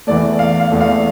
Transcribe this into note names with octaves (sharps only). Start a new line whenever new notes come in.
E2 E3 A3 D5
F5
F5
E2 E3 A3
F5